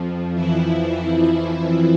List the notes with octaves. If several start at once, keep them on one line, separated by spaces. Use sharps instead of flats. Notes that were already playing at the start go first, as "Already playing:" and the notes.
Already playing: F2 F3
E3 E4